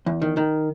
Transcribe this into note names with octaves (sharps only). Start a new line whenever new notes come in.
E2
D#3
D#3